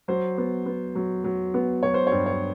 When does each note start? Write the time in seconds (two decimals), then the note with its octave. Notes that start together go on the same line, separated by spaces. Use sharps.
0.08 F#3 C5
0.38 B3
0.66 B3
0.95 F#3
1.24 F#3
1.54 B3
1.82 F#3 C#5
1.94 C5
2.07 C#5
2.12 G2
2.26 C#5